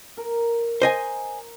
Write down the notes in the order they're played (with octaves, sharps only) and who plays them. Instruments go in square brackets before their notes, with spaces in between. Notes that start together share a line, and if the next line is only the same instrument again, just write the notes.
[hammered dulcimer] A#4
[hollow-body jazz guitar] C5 D#5 G#5